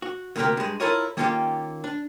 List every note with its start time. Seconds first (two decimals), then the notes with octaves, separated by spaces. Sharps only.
0.02 F#4
0.36 D2 C3 A#3 C#4 G4 A#4
0.57 G2 G#3
0.80 E4 F4 A4 A#4 C#5 D#5
1.17 D#3 A#3 C#4 F4 G4 A4
1.84 D4